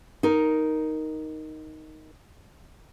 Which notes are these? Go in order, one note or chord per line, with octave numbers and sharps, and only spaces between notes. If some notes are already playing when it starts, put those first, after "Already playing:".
D#4 A#4